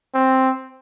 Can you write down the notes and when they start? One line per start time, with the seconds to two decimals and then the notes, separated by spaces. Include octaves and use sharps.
0.15 C4